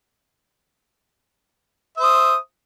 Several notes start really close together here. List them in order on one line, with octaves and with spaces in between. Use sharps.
E5 C5 D#6